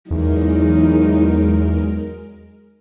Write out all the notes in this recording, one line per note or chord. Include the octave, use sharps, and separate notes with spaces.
E2 F#3 G#3 D#4 A#4